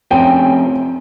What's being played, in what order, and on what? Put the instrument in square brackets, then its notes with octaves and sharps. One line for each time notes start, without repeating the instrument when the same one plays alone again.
[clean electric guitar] C3 F3 C#4 [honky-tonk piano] G5